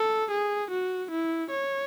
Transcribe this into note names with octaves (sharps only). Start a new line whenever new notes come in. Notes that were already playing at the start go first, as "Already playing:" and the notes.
Already playing: A4
G#4
F#4
E4
C#5